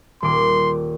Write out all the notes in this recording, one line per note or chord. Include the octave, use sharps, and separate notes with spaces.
D#1 C6 D6